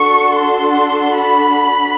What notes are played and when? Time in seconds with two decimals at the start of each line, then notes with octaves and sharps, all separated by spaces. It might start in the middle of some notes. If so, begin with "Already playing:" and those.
Already playing: D4 F#4 A4 C#6
0.36 C6
1.14 B5